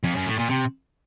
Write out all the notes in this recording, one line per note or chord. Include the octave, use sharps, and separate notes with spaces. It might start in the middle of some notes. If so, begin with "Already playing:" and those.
F2
F#2
A2
A#2
C3